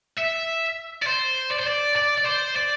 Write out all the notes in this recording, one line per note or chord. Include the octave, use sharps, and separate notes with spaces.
E5
D5
C5
D5
C5
D5
D5
D5
C5
D5